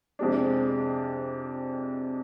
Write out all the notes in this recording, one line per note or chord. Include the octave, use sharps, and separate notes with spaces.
F2 C3 G#3 D4